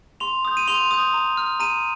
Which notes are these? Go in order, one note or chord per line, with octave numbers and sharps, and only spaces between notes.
C6 F7
D#6 G6
D#7
C6 F7
D#6 G6
A#5
F6
A#5 D#7